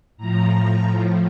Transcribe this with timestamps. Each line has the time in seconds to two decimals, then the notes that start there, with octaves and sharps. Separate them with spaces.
0.17 A2 F3 A#5
0.81 A2 F3